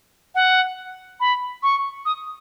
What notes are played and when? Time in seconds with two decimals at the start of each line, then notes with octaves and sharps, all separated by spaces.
0.35 F#5
1.20 B5
1.63 C#6
2.05 D#6